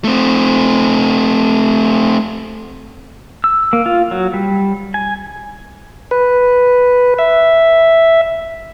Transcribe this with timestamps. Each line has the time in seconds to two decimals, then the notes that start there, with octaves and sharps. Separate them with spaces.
0.04 A3 C4
3.44 E6
3.73 A#3
3.86 F4
4.11 F#3
4.34 G3
4.94 G#5
6.11 B4
7.19 E5